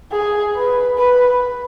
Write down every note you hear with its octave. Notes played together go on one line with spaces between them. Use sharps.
G#4
B4
B4